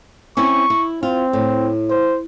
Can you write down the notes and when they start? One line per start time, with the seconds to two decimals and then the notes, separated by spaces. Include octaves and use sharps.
0.37 C4 C#4 E4 C#6
0.70 E4
1.03 C4 F4
1.33 A2
1.90 C5